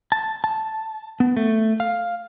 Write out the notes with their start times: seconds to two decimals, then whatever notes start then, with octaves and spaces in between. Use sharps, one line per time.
0.12 A5
0.44 A5
1.20 B3
1.37 A3
1.80 F5